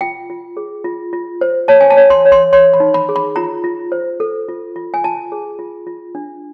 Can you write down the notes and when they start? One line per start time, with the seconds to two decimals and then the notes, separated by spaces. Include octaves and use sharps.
0.01 F4 G5
0.30 F4
0.57 G#4
0.84 F4
1.13 F4
1.41 C5
1.68 C#5 A5
1.81 G#5
1.90 A5
1.97 C#5
2.10 C6
2.25 C#5
2.32 C6
2.53 C#5 C6
2.74 B5
2.80 D#4
2.94 B5
3.09 G#4
3.16 B5
3.36 F4 A#5
3.64 F4
3.92 C5
4.20 A4
4.48 F4
4.76 F4
4.94 G#5
5.04 F4 A5
5.32 G#4
5.59 F4
5.87 F4
6.15 D4